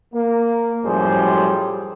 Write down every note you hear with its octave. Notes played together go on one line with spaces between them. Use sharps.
A#3
F#2 A2 F3 G3 G#4 C5